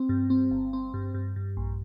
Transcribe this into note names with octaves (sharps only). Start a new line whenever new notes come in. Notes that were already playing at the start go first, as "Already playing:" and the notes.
Already playing: C4
G2
C4
G1
C4
G2
G2
G2
A#1